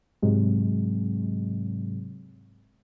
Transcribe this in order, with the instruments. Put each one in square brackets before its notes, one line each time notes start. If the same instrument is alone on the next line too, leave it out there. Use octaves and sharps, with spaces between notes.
[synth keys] G#2 C3 F#3 G#3